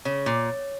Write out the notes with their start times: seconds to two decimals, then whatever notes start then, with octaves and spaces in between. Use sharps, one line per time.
0.05 C#3 C#5
0.26 A#2